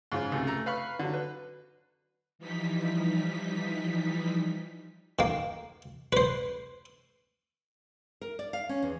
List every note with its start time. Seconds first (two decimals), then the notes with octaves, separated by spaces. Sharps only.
0.12 G#2 C#3 F4
0.32 C#2 F#2 C3 A3
0.47 A3 A#5
0.66 B4 F5 B5 C#6
0.99 D3 F#3
1.13 B4
2.39 E3 F3 G3 D#4 B6
5.19 D#3 A#3
6.13 B4 C5
8.21 A#4
8.39 D5
8.53 F5
8.69 C#4
8.83 E2